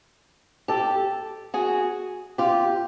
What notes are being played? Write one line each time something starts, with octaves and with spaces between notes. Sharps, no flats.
G4 A4
F#4 G#4
F4 G4